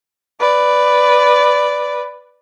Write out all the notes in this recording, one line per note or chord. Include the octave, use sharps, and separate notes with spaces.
B4 D5